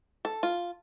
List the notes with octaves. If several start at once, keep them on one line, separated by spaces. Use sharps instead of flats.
A4
F4